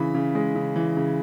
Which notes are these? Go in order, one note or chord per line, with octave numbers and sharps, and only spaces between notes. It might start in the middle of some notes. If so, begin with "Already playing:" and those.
Already playing: C#3 E3 B5
C#3
G#3
C#3
E3
C#3